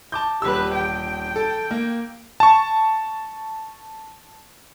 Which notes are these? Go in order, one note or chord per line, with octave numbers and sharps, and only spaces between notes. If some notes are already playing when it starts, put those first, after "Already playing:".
A5 D6 G6
D#1 G4 B4 E6
G5
A4
A#3
A5 C#6